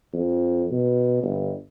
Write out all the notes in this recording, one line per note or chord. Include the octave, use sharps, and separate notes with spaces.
F2
B2
G1